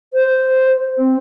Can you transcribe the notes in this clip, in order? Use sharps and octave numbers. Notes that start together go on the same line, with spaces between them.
C5
C4